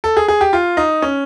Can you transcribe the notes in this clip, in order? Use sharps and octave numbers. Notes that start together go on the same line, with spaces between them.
A4
G#4
G#4
G4
F4
D#4
C#4